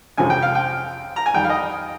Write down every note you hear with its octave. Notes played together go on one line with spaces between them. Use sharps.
F2 C3 F3 G#3 C#4 G#5
G5
F5
G5
A#5
G#5
F2 D#3 G3 G5
F5
D#5